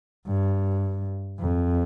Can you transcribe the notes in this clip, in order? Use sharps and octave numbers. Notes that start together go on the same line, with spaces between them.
G2
F2